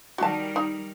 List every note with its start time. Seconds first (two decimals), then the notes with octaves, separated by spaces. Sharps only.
0.18 D#3 G3 F#4 A#4 A5
0.56 D#4